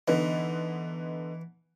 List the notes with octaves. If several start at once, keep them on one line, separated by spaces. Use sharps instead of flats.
D3 E3 B3 D#4